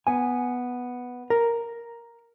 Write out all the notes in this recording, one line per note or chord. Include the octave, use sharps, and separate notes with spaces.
B3 G#5
A#4